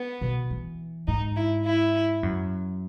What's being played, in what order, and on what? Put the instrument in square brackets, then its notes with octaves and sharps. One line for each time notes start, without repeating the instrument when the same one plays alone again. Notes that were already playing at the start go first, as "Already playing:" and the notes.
Already playing: [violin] B3
[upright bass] B2
E3
[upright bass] G#2 [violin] D#4
[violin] E4
E4
[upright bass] F#2